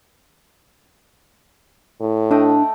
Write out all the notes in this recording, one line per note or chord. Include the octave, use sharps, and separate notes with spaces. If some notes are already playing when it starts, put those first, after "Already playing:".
A2
A3 D4 D#5 G5